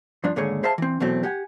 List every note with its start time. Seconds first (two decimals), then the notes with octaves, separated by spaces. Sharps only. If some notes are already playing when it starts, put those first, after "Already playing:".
0.24 G2 F3 D4
0.36 D#2 G#2 D3 A3 G#4 C#5
0.63 G#4 C5 E5 F5 A5
0.78 E3 C4
1.00 E2 B2 E3 F#3 A3 C4
1.23 G4 F#5 G#5